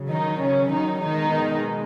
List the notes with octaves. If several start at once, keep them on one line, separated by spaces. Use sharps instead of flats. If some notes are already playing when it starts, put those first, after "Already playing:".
Already playing: C#3 F#3
D#3 D#4
C#3 C#4
D#3 D#4
B2 D#3 G#3 D#4